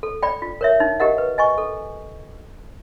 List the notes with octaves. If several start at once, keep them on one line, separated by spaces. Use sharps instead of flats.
A4
D5 G5 B5
F4
A#4 C#5 E5
D#4
G4 A#4 D#5 F#5
B4
D#5 G#5 C#6
A4